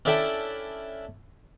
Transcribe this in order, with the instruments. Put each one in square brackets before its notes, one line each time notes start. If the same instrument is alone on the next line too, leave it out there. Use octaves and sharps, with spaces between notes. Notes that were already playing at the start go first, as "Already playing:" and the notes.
[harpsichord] C#4 D4 E4 A4 E5 G5